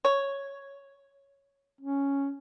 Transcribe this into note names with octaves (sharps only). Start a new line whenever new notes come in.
C#5
C#4